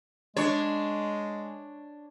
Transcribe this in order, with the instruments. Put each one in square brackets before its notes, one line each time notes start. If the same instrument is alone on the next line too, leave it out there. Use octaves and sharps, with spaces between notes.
[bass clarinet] G#3 [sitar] D4 C#5